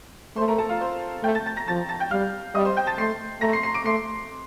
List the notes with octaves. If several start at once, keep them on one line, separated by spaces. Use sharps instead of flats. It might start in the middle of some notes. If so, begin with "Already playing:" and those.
A3 C5 C6
A#4 A#5
A4 A5
F4 F5
C5 C6
A3 G5 G6
A5 A6
A5 A6
A#5 A#6
F3 A5 A6
A5 A6
G5 G6
G3 F5 F6
G3 D#5 D#6
C5 C6
G5 G6
A5 A6
A3 C6 C7
A3 A#5 A#6
C6 C7
C6 C7
D6 D7
A3 C6 C7